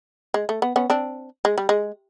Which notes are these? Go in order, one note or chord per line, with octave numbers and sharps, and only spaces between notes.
G#3
A3
B3
B3 C#4
C4 D4
G#3
G3
G#3